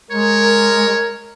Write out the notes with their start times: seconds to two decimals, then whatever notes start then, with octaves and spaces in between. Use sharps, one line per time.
0.11 G#3 A#4 C#5